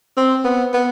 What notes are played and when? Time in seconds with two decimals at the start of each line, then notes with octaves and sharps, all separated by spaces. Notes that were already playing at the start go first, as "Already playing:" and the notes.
0.17 C4
0.44 B3
0.74 B3